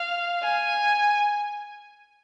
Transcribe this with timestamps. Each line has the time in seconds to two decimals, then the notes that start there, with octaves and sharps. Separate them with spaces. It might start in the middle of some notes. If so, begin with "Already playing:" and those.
Already playing: F5
0.43 G#5